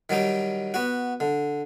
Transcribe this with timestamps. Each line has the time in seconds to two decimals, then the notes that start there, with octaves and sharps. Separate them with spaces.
0.09 D#3 F#3 G3 D#4
0.74 B3 F#4
1.20 D3